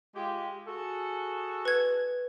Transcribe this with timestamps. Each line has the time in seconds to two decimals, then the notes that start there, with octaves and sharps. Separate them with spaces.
0.15 G#3 F4 G4
0.67 F#4 G#4 A4
1.65 B4 G#6